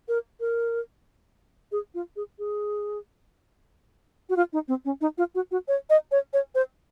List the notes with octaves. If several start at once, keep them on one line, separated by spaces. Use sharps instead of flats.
A#4
A#4
G#4
F4
G#4
G#4
F#4
F4
D#4
C4
C#4
D#4
F4
F#4
F#4
C#5
D#5
C#5
C#5
C5